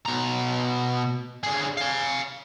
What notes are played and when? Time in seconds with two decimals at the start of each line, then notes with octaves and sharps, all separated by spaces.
0.05 B2 A#5
1.44 D3 G#4
1.77 F5 G#5